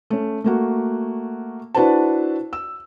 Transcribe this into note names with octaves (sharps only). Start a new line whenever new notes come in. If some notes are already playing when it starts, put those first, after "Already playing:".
A3 C#4
A3 A#3 F#4
D4 E4 F#4 B4 C5 A5
E6